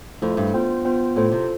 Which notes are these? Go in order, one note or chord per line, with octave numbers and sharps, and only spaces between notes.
F2 A3 E4 A4 C5
G2
B3 F4 C5 G5
B3 F4 C5 G5
A2 F4 A4 C5
C3